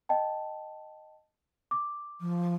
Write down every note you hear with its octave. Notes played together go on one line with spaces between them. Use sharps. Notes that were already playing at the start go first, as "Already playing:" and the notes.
D#5 G5 A5
D6
F3